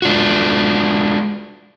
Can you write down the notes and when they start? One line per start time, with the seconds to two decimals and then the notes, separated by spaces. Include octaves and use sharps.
0.02 G#3 D4 F4 F#4